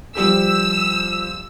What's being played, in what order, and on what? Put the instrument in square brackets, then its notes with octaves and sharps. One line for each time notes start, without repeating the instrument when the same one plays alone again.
[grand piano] F3 G3 G4 [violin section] E6